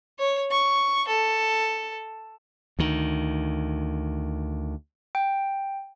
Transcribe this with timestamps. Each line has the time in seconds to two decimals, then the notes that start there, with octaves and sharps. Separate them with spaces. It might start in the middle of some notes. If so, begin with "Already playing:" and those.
0.19 C#5
0.51 C#6
1.08 A4
2.79 D2 D#3
5.15 G5